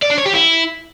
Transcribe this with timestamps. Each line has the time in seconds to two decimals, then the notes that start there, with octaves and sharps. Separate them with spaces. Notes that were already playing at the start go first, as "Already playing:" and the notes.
0.02 D5
0.10 D4
0.18 C#5
0.26 G4
0.33 E4